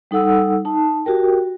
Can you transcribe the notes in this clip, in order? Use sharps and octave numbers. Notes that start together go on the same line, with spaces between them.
G3 D#4 A4 F#5 E6
D#4 A5
F#4 G4 A#4 G5